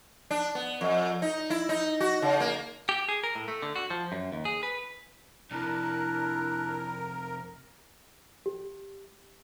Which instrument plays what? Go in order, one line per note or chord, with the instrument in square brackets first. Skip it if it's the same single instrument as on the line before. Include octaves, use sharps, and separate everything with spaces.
[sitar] D4
B3
F2
D#4
E4
D#4
F#4
C#3
A#3
[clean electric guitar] G4
G#4
A#4
A2
A3
D3
F#4
F3
F#2
D#2
G#4
B4
[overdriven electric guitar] F2 C3 [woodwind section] D4 E4 [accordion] A#4 [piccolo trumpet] F#6
[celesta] G4